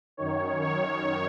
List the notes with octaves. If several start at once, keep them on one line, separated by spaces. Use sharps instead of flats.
F#2 D#3 C#5
C#5